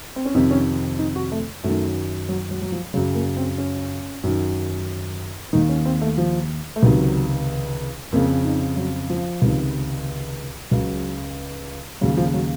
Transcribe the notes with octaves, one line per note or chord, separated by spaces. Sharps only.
C4
C#4
F2 C3 D#3 D#4
C#4
D#4
F#4
A3
F#2 D#3 A3
F#3
F#3
F#3
F3
F#2 C#3 F#3
A#3
C4
C#4
F#2 D#3
D#2 D#3 D#4
C#4
C4
A3
F3
A3
C#2 C3 D#3 F#3
F2 C#3 A#3
D#4
F#3
F3
C#2 C3 D#3
C#2 C#3 F#3
D#2 C#3 F#3
F3
F#3